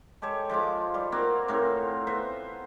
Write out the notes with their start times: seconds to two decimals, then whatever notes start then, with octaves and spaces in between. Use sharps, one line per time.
0.22 G#3 G4 A4 C#5
0.50 F3 G#3 F4 D6
0.94 G3
1.12 A#3 C4 F4 F#4
1.48 A2 C4 A#4 C#5
2.07 B3 C5 E5